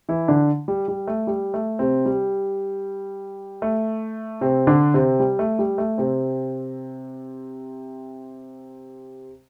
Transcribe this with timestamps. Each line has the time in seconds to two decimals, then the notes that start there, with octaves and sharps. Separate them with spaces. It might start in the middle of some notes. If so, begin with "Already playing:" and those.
0.09 E3 E4
0.28 D3 D4
0.68 G3
0.88 G3
1.07 A3
1.27 G3
1.54 A3
1.79 C3 C4
2.06 G3
3.62 A3
4.41 C3 C4
4.67 D3 D4
4.94 C3 C4
5.20 G3
5.39 A3
5.59 G3
5.78 A3
5.98 C3 C4